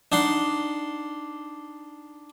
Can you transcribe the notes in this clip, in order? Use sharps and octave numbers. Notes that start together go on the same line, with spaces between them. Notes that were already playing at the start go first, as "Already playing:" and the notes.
D4 D#4 F#5 C6